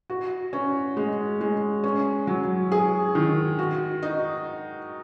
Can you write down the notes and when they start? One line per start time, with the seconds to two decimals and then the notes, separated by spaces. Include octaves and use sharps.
0.10 F#4
0.53 C#4
0.97 G#3
1.41 G#3
1.84 C#4
2.27 F#3
2.72 G#4
3.15 D#3
3.59 F#4
4.03 D#4